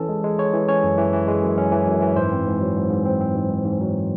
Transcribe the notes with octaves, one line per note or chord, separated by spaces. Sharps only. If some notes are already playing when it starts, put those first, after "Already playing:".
Already playing: E3 C#4 A4
G#3
G#3
G#3 C#5
E3
C#4 C#5
F#2
E3
E3
G#3
F#2
C#4
E3
F#2
E3
G#2 C5
C4
G#2
F#3
G#2
G#2
C4
C4
G#2
G#2
G#2
F#3